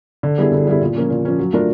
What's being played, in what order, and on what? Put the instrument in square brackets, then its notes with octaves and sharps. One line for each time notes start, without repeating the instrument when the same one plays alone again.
[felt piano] D3
G3 B3 E4 G#4
D3
G3 B3 E4 G#4
A#2
F3 A#3 C#4
A#2
F3 A#3 C#4
F#3
A3 D4 F4 A#4